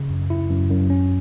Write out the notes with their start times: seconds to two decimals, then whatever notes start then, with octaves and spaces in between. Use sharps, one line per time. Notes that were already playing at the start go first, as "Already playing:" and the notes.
Already playing: C#3
0.10 F#2
0.30 E4
0.50 F#2
0.70 F#2
0.90 C#4